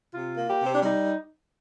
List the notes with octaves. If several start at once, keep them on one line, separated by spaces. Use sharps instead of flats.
C3 F4
A#3
G4
C3
C4
D4
G3 D#4